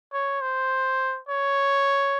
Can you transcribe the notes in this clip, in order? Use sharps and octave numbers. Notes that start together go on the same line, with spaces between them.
C#5
C5
C#5